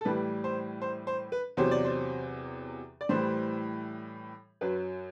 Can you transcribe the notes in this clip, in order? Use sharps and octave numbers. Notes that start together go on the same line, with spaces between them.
A4
A2 E3 G3 B4
C5
C5
C5
B4
E2 C3 F#3 C5
D5
C5
D5
A2 E3 G3 C5
F#2 F#3 B4